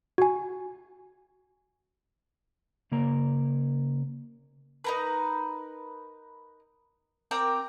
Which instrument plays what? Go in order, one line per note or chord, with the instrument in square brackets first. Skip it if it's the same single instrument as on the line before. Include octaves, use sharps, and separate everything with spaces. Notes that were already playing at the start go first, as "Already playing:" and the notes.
[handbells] F#4 G#5
[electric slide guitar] C#3 A#3 A#4 A#5
[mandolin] D#4 A#4 B4
C4 A#4 G5 D6